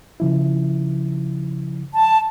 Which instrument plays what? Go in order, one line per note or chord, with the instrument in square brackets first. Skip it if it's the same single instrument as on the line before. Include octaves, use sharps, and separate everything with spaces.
[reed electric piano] C#3 F3 E4
[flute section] A5